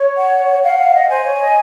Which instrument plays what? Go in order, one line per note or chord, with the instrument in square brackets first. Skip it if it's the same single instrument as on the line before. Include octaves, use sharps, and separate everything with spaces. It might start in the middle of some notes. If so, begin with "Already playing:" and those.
Already playing: [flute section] C#5
[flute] F#5
[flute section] F5 [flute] F#5
[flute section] F5
D#5
[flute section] C5 [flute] G#5
[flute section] C#5
D#5